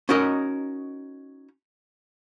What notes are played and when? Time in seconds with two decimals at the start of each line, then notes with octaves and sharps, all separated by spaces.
0.09 C#4 D#4 F#4 A#4 D#5